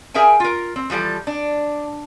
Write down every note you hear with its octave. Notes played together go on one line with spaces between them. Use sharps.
G#4 A#4 E5 G5 G#5
F4 A#4
C4
E3 F3 G3 A4
D4